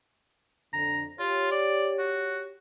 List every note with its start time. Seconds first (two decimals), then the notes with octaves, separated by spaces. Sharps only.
0.73 F2 D3 A#5
1.19 F4 G4 C#5
1.51 D5
1.98 F#4